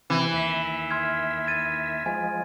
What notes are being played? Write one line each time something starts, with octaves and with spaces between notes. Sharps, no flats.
C3 E3 C4
D#2 E5
C6 F6 G#6
G#6 A6 D#7
F3 G#3 G#5